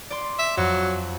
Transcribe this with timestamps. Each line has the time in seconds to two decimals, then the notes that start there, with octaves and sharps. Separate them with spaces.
0.10 D5 C6
0.39 E5
0.57 F2 F#3